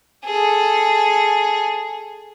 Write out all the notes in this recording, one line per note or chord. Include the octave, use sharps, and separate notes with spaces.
G#4 A4